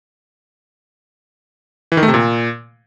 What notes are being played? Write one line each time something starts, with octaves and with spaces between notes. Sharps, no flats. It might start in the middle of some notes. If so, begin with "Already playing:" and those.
E3
D#3
A3
C3
A#2